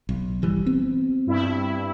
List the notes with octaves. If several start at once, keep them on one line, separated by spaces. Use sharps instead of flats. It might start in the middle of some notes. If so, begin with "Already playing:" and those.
B1
G1 E3 G3
B3 C4
G2 E4